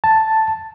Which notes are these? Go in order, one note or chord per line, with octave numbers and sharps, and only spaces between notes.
A5